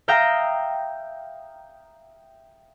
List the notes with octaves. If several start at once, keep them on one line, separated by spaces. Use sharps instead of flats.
E5 F5 G5 A#5 D#6 G6